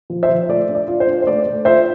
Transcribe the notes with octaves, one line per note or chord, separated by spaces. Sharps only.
F3
C5 E5
F3
A3 D5
D4
D5
F4
C5
D4
C5
A3 D5
A3
F4 C5 E5